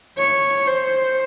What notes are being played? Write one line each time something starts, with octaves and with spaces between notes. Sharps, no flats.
C#5
C5